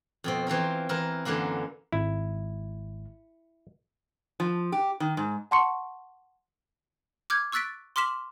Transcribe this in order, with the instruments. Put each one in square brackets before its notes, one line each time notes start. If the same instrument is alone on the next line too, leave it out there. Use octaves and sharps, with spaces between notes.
[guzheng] F2 B2 C4
E3 C4 F4 A#4
E3 E4 A#4
F#2 D3 E3 A#3 E4
[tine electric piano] G#1 [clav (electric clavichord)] E4
[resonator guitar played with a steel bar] F3
G4
D#3
G#2
[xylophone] F#5 A5 C6 C#6 C#7
D6 F6 G6 G#6
C#6 E6 F#6 A6 B6 D7
C6 D6 F6 B6 E7 F#7